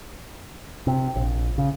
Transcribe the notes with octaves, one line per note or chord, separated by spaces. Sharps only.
C3
A#1
C#3